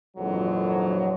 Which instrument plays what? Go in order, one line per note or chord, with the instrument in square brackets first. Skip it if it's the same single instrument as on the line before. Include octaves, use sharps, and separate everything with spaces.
[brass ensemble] A#1 F2 G#2 D3 E3 F#3